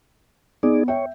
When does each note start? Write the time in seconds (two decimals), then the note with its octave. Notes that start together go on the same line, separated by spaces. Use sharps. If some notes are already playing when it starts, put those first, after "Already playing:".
0.63 B3 D#4 G#4 D5
0.88 C#5 E5 G5